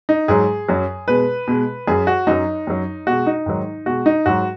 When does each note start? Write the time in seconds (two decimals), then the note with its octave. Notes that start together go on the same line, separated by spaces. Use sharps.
0.09 D#4
0.28 G#2 F#3 G#4
0.68 F#2 F#3
1.08 B2 G#3 B4
1.47 B2 G#3
1.87 F#2 F#3 G#4
2.07 F#4
2.27 F#2 F#3 D#4
2.67 F#2 F#3
3.07 B2 G#3 F#4
3.27 D#4
3.46 G#2 D#3 F#3
3.86 B2 G#3 F#4
4.06 D#4
4.26 G#2 F#3 F#4